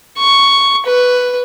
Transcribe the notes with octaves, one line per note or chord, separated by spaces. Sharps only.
C#6
B4